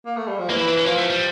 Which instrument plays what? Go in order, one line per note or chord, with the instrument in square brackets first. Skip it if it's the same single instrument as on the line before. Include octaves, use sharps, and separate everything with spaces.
[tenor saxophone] A#3
A3
G3
F3
[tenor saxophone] E3 [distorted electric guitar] A#3
[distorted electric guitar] E4
D4
C#4
[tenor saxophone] F3 [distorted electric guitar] A#3
[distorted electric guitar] A3
G3